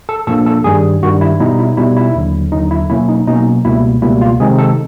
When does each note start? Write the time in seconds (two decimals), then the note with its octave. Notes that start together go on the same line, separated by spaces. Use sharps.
0.09 A4
0.27 A#2 F3 A#3 D4 A4
0.46 A4
0.64 G2 D#3 G3 G#4
1.03 G2 D#3 G3 F#4
1.21 E4
1.39 B2 G3 B3 D#4 E4
1.59 E4
1.77 B2 G3 B3 D#4 E4
1.97 E4
2.15 D#2 D3 F#3
2.52 D#2 D3 F#3 D#4
2.71 E4
2.90 B2 F#3 A#3 C#4 E4
3.09 D#4
3.27 B2 F#3 A#3 C#4 D#4
3.65 C#2 B2 G3 A#3 E4
4.02 C#2 B2 G3 A#3 E4
4.21 F4
4.40 C3 D#3 G#3 C4 D#4 G#4
4.59 A4